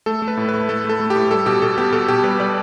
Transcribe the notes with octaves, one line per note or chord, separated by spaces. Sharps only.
A3 A4
A3
B4
A2
B4
A3
A3 A4
A3 A4
A3
G4
A2
G3 A4
B2 G4
B2 A4
B3 G4
B2 A4
B2 G4
G3 B4
G3 D5